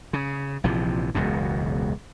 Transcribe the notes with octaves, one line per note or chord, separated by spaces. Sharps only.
C#3
A#1 C3 E3 F3
E1 C#2 F#2 B2